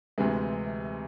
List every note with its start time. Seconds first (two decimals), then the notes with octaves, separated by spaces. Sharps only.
0.18 D2 C3 E3 G#3